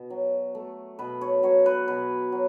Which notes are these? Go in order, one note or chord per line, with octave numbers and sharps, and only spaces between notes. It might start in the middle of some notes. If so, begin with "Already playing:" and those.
Already playing: B2
F#3
A3
B2 B4
C#5
F#3 C#5
B4
B2 B4
F#3